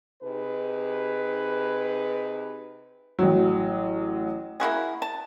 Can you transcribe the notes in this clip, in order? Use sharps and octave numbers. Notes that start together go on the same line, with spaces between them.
C3 D#4 G#4 B4
A1 F#3
A#3 E4 F#4 G#4
A5